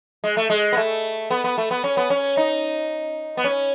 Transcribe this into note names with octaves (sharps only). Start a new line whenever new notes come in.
G#3
A3
G#3
B3
A3
B3
B3
A3
B3
C#4
B3
C#4
D#4
B3
C#4